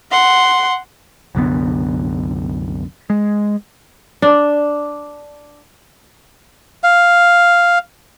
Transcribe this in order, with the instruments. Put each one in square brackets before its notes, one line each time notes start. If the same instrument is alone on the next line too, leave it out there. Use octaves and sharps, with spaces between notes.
[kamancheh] F#5 C6
[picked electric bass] C2 F#2 D3 B3
G#3
[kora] D4
[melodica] F5